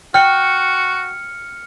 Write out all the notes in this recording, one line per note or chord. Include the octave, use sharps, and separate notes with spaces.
F#4 G5 F6 C#7